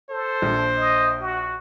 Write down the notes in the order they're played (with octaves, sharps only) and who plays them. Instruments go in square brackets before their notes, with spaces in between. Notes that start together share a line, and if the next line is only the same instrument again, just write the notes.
[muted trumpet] A4 [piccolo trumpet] C5
[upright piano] A#1
[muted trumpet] D#5
F#4